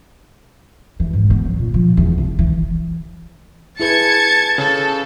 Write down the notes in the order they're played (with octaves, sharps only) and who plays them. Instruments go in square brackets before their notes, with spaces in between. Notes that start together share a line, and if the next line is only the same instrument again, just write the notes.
[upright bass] E3
G#2
B3
F#3
A#2
F3
E2
C2
E3
[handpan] E4 G#4 B4 [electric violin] A5 [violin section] G#6 C#7
[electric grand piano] C#3 [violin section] A4